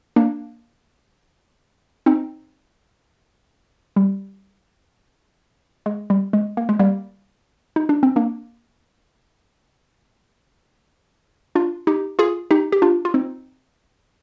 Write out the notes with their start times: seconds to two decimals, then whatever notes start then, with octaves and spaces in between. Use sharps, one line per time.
0.16 A#3 D4
2.06 C4 D#4
3.96 G3
5.86 G#3
6.10 G3
6.33 G#3
6.57 A#3
6.69 G#3
6.79 G3 A#3
7.76 D#4
7.89 D4
8.03 C4
8.16 A#3 D4
11.55 D4 F4
11.87 D#4 G4
12.19 F4 G#4
12.51 D#4 G4
12.72 G4
12.82 D4 F4
13.05 F4
13.14 C4 D#4